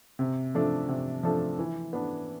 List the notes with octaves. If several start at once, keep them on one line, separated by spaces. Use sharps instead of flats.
C3
F3 A3 D4 A4
C3
F3 A3 D4 A4
E3
B3 D4